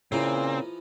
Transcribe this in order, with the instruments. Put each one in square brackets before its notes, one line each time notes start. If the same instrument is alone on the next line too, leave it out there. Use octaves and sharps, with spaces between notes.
[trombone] A#2 [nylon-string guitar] C#3 [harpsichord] E3 F3 D#4 [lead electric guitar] C4